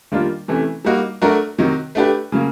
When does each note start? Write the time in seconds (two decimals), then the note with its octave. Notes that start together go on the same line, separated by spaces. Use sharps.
0.12 D#3 G3 A#3 D4 F4
0.48 C3 E3 A3 C#4
0.85 G3 A#3 D#4 F#4
1.22 F#3 A3 D4 F#4 A#4
1.58 C3 D#3 F#3
1.95 A3 D4 G4 B4
2.32 C#3 F#3 A#3